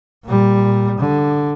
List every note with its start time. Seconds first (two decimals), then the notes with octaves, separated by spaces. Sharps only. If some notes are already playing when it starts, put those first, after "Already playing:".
0.25 A#2 G3
0.98 D3